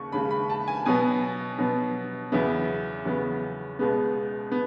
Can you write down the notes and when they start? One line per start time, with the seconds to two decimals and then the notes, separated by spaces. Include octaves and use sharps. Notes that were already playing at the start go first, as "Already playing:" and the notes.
Already playing: D#2 C#3 C#6
0.12 D#2 C#3 G#3 B5
0.30 B5
0.50 A5
0.68 G#5
0.86 B2 F#3 B3 G#5
1.58 B2 F#3 B3
2.32 E2 C#3 F#3 B3 E5
3.05 E2 C#3 F#3 B3
3.79 C#2 B2 G#3 B3
4.52 B3